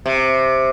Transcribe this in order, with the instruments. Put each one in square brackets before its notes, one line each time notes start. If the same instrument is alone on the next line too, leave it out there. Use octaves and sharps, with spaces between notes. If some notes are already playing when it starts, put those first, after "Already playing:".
[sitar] C3